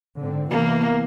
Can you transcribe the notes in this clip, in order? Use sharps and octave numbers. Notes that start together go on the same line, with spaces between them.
G#2 D3 C4
C3 E3 A#3 B3